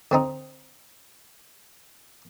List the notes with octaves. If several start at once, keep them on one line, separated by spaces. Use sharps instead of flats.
D3 C4 D#4